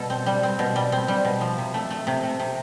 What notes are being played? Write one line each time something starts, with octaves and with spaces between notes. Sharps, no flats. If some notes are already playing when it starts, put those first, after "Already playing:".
Already playing: B2 G3 A4 A5
C4
G3
C4
B2
G3
C4
G3
B2
F3
C3
A3
A3
C3
A3
C3